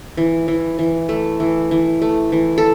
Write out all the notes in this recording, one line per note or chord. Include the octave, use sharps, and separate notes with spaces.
E3
E3
E3
A3
E3
E3
A3
E3
A4